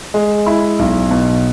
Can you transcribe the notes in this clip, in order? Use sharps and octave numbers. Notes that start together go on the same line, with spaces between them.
G#3
E4
B1
B2